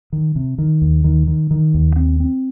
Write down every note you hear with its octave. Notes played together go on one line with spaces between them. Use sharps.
D#3
C3
D#3
D#2
D#3
D#3
D#3
D#2
C4
C4